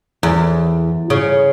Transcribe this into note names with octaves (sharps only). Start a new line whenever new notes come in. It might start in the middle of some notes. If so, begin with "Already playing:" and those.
E2
C#3